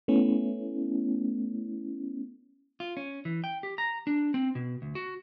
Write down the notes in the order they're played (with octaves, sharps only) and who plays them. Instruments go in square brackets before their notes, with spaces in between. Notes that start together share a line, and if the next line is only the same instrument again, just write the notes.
[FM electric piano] A3 B3 C#4 E4
[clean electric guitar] F4
C#4
E3
G5
G4
A#5
D4
C4
B2
D2
F#4